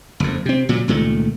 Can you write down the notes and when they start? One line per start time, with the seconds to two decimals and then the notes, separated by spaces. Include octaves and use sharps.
0.20 F#1 F2
0.46 C3 C4
0.69 A#2 C#3 F#3
0.88 C#2 A#2 D#3 A3